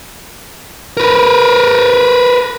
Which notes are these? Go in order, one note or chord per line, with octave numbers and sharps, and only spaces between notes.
A#4 B4